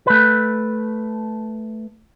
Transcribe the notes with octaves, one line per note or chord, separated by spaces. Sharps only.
A3 B4